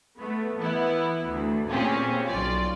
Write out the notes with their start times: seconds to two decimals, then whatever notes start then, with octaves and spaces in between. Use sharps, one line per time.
0.17 A3 B3
0.59 E3 B3 E4
1.25 D2
1.71 A#2 C4 C#4 G4 G#4
2.27 B1 F4 D5